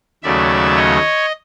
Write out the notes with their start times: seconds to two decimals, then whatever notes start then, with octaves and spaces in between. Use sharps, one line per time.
0.23 D#2 C#3 F#3 A3 D5 E5
0.76 C#5 D#5